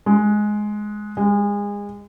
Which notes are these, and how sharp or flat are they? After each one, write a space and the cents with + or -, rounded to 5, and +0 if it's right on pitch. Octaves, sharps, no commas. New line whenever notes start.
G#3 +10
G#3 -30